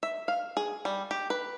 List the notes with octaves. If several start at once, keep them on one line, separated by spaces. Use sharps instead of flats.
E5
F5
G#4
G3
G4
B4